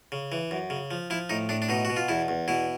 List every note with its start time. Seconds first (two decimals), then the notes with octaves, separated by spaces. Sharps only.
0.12 C#3
0.32 E3
0.51 F#2
0.70 C#3
0.91 F3
1.10 F3 E4
1.29 A2 D#4
1.49 A2 D4
1.62 D4
1.69 B2 D#4
1.85 B2 F#4
1.97 F4
2.08 E2 E4
2.28 E2
2.48 B2 E4